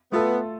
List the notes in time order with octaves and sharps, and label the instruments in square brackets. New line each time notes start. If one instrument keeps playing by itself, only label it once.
[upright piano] A3 F4 A4 [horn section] B3